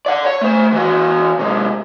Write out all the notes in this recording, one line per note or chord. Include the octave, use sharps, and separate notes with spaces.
D5 F#5
C#5
A3 C5
E3 F#4
C3 G#3